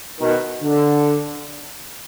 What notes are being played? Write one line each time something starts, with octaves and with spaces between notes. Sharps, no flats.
B2 D#3
D3